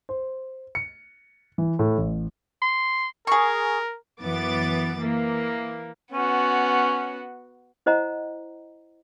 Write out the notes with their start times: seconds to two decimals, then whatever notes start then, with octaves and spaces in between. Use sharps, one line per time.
0.09 C5
0.75 C#7
1.58 E3
1.79 A2
1.98 A1
2.62 C6
3.27 G#4 A#4 C#6
4.20 F#2 E3 B3 D6 A6
5.00 E3 A#3
6.12 B3 C#4 F#4
7.86 E4 C5 D#5 F#5 A#5